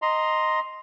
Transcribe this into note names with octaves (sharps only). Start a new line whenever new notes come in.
D#5 A#5 C6